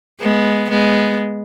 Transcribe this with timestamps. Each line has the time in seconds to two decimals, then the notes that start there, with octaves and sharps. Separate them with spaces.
0.20 G#3 B3
0.70 G#3 B3